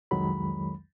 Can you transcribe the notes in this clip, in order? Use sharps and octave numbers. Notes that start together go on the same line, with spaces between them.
C2 F2 D#3 F#3 G#3 B5